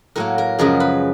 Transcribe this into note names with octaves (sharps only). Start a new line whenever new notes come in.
A2 F#3 A#3 A#4
A#4
F#2 C#3 F3 G#3 A#4
B4